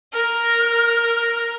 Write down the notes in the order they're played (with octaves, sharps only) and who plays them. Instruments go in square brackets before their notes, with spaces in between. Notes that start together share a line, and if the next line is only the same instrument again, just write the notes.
[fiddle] A#4 [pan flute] F6